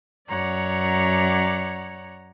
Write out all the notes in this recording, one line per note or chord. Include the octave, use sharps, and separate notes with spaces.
F#2 C#5 D5 F#5 A#5